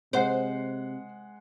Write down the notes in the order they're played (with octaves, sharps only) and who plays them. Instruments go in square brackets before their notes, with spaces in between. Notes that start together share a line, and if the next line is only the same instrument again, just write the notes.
[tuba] C3 [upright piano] G#3 F#5 C7 [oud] C5